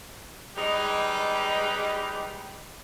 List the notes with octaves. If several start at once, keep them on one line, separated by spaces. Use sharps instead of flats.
G3 G#3 D#4 G4 B4